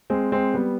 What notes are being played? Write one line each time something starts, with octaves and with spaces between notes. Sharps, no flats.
G#3 C4
G#3 C4
G3 B3